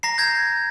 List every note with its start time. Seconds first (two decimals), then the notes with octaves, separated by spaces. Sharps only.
0.03 A#5 A#6 C7
0.18 G6 G#6 A#6